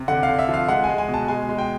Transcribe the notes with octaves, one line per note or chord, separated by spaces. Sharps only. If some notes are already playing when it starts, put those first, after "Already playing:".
Already playing: C3
D3 F#5
F5
D3
E5
F3
F5
G#3 F#5
G#3 G#5
G#5
B2
A5
G#3 G#5
G#3
G5